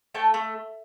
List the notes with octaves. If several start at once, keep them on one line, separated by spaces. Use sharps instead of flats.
A3 G5 A5
A3